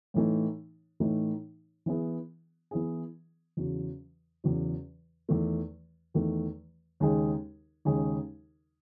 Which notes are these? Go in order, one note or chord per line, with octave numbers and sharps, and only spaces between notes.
A2 E3 A3 D#4
A2 E3 A3 D#4
E3 B3 E4 G#4
E3 B3 E4 G#4
E2 C#3 F#3
E2 C#3 F#3
E2 D#3 A3
E2 D#3 A3
D#2 C#3 G#3 D#4 G#4
D#2 C#3 G#3 D#4 G#4